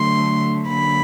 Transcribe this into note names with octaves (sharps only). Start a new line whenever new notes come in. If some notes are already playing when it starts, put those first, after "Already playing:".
Already playing: D3 F#3 A3 C6
D3 F#3 A#3 B5